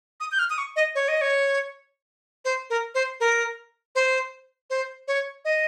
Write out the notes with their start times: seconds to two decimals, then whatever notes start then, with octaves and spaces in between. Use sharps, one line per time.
0.20 D#6
0.32 G6
0.39 F6
0.50 D#6
0.58 C#6
0.76 D#5
0.95 C#5
1.08 D#5
1.21 C#5
2.45 C5
2.70 A#4
2.95 C5
3.20 A#4
3.95 C5
4.70 C5
5.08 C#5
5.45 D#5